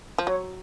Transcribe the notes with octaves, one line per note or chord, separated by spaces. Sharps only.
F3
F#3 C#5